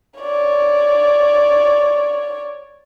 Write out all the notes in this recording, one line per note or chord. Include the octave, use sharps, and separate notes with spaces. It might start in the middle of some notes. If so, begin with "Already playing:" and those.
C#5 D5